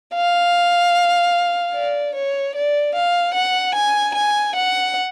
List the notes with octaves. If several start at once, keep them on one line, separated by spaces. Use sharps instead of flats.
F5
D5
C#5
D5
F5
F#5
G#5
G#5
F#5